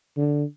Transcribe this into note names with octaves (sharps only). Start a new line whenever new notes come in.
D3